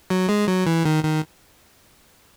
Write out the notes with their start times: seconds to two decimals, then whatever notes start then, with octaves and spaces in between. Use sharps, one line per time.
0.10 F#3
0.29 G#3
0.48 F#3
0.67 E3
0.85 D#3
1.04 D#3